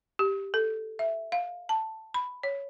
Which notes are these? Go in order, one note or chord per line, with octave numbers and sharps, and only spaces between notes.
G4
A4
E5
F5
A5
B5
C#5